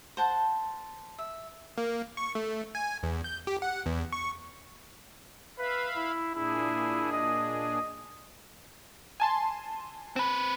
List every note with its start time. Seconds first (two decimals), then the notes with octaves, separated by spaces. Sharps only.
0.17 C5 F#5 A5
1.19 E5
1.78 A#3
2.17 C#6
2.35 A3
2.75 G#5
3.03 E2
3.24 G6
3.47 G4
3.62 F#5
3.86 E2
4.13 C#6
5.58 B4 E5 F5 B5
5.96 E4
6.35 A#2 D4 E4 G#4
7.12 D#5
9.20 G#5 A5 C6
10.16 C4 B4